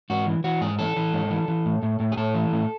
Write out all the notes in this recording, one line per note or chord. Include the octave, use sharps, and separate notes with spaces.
G#2 F#4
E3
E3 F#4
G#2 G#4
E3 A4
E3
G#2
E3
E3
A2
A2
A2
G#4
A2 A4
E3
A2